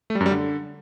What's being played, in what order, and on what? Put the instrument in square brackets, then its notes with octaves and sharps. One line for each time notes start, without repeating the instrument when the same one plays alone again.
[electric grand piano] A3
G3
F#2
G3
D3